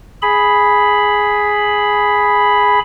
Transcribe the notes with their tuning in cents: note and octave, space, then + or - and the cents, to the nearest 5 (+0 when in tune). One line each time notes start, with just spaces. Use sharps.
G#4 +0 B5 +0